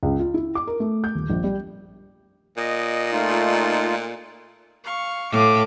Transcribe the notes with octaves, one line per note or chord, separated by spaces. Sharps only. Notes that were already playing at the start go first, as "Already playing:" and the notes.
C#2
F4
E4
D6
A#4
A3
G6
D#1
A#1
G3
A#2 D#5
A3 D#4 F4
F5 C#6
A2 F5 D6